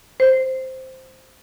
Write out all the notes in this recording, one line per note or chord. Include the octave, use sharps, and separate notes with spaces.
C5